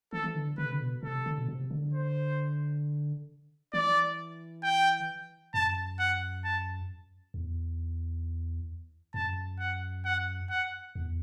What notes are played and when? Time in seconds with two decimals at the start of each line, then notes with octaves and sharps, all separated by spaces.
0.13 E3 A4
0.24 E3
0.35 D3
0.58 D3 B4
0.65 C3
0.72 D3
0.80 B2
1.03 C3 A4
1.26 D3
1.38 B2
1.49 C3
1.71 D3
1.93 C5
3.73 E3 D5
4.63 G5
5.54 F#2 A5
5.99 F#5
6.44 A5
7.34 E2
9.14 F#2 A5
9.59 F#5
10.05 F#5
10.50 F#5
10.95 E2